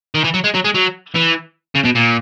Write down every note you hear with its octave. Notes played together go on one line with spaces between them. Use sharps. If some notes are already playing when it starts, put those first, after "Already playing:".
D#3
E3
F#3
G#3
F#3
G#3
F#3
E3
C#3
B2
A#2